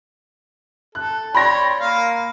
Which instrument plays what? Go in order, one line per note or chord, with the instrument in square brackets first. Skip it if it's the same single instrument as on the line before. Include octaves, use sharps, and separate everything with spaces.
[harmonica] A4 [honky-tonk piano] F#6
[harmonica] C#5 D5 G5 [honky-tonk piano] B5 C6 A#6
[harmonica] A#3 F5